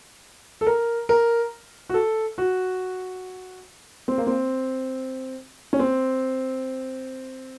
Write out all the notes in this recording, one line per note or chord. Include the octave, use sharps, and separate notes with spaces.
A4
A#4
A#4
F#4
A4
F#4
C4
A#3
C4
C#4
C4